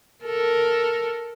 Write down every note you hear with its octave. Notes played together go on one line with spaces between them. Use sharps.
A4 A#4